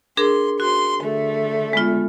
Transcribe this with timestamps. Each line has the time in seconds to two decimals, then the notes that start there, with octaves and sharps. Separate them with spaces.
0.17 D4 G#4 A#4 C6
0.60 F#4 C6
1.01 D3 A3
1.73 G#3 B3 F4